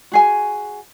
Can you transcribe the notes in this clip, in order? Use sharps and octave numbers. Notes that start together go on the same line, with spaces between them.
F#4 G#4 G#5